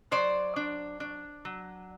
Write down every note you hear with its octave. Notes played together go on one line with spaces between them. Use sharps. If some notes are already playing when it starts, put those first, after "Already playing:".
F#3 C5 D5
D4
D4
F#3